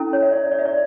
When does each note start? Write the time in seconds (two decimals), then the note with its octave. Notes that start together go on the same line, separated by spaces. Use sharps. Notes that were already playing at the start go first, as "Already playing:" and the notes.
Already playing: C#4 E4 A4
0.13 C#5
0.23 E5
0.32 D5
0.52 D5
0.59 E5
0.65 D5